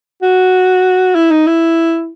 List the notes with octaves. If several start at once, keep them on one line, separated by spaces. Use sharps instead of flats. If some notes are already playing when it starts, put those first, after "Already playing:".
F#4
E4
D#4
E4